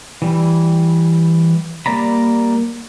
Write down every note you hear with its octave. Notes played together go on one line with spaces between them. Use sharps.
E3 G3
G3 A#3 D5 A#5 B5